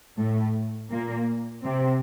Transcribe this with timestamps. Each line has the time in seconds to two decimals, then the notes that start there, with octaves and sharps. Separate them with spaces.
0.18 A2 A3
0.91 A#2 A#3
1.64 C3 C4